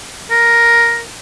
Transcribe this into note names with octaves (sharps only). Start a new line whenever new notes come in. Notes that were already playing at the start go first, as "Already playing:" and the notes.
A#4